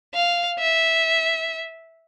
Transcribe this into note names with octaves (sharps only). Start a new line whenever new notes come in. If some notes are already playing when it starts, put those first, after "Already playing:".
F5
E5